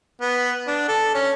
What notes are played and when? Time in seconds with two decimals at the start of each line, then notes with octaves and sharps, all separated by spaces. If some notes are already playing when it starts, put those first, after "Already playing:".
0.21 B3
0.67 D4
0.88 A4
1.15 C#4